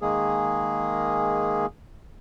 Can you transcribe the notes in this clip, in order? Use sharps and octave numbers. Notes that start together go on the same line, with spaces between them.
D#3 G#3 A#3 G#4